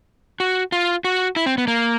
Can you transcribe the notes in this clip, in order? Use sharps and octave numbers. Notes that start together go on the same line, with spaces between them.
F#4
F4
F#4
E4
C4
B3
A#3